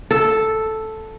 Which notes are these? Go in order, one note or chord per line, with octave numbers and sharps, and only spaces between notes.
A4